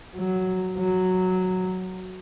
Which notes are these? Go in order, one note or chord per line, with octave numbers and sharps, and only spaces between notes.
F#3
F#3